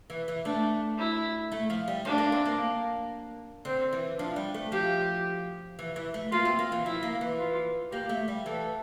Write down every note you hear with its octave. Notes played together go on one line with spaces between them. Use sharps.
E3
E3
A3 D4
E4
A3
F3
G3
A3 D4
A#3
C4
A#3
D3 C4
E3
F3 D4
G3
A3
F3 G4
E3
E3
A3
A#3 F4
C4
A#3
E3
F3 E4
A#3
E3
F4
A#3 G4
A3
G3
E3 A4